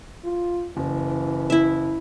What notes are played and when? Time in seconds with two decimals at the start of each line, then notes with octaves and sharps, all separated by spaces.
0.24 F4
0.77 F#1 E3
1.50 E4 E5